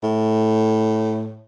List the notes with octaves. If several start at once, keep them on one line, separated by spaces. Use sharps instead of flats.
A2